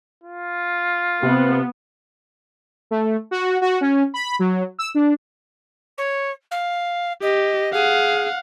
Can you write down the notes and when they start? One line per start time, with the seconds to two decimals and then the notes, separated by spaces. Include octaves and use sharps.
0.23 F4
1.23 C3 B3
2.91 A3
3.31 F#4
3.62 F#4
3.81 C#4
4.14 B5
4.39 F#3
4.79 E6
4.95 D4
5.97 C#5
6.51 F5
7.22 G4 D#5
7.73 G#4 F5 F#5